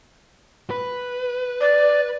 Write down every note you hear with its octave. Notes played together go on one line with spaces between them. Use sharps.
B4
D5